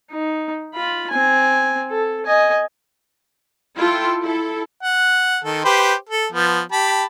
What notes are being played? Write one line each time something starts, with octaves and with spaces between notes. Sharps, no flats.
D#4
F4 B5
C4 G#5
A4
D#5 G#5
E4 F4 A4 G5 C6
E4 A4
F#5
D#3 A4
G4 B4 C5
A4
F3 B3
G4 A5 B5